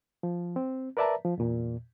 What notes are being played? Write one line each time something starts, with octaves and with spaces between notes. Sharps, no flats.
F3
C4
A#4 B4 D5 E5 A5 A#5
F3
E2 A#2